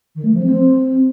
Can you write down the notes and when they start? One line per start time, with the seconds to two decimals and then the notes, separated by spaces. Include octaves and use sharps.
0.15 D#3
0.24 A3
0.34 F3
0.43 C4